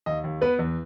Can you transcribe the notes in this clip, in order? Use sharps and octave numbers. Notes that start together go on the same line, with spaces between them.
D#2 D#5
D#2
B3 B4
E2